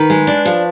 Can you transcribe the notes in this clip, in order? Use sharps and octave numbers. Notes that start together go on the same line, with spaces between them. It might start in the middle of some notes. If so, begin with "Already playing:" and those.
Already playing: D#3 B4
G#3
D4
F3